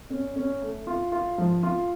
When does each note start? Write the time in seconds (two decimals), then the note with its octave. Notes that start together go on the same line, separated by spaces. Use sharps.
0.10 C#4
0.36 C#4
0.62 A3
0.87 F4
1.12 F4
1.38 F3
1.63 F4